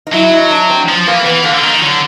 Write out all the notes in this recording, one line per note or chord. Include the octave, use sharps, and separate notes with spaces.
D#4
F#3 E4
D#4
D4
C4
F3
E3 A#3
C4
E3 B3
D3 A#3
D3
D#3
D3 F#3